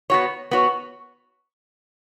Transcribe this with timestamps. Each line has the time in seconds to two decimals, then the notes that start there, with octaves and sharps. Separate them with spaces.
0.10 B3 F#4 C#5
0.51 B3 F#4 C#5